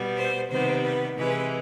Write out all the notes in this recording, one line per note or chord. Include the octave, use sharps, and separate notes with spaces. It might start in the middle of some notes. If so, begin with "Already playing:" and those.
Already playing: B2 G3 B3
C5
C3 D#3 G3 B3 C5
B4
C3 E3 G#3 B4